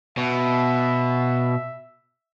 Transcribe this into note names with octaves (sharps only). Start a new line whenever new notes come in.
B2 E5